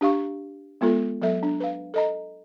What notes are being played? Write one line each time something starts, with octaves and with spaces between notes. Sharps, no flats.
D4 G4 F5 C#6
G#3 B3 F4 A4
F#3 B3 A4 E5
D4
B4 F5
A4 D#5 A#5